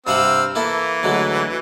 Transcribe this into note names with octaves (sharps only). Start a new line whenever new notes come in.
G2 C3 C4 F5 F#5 E6
E3 A#3 E4 A4
D2 F#3 G#3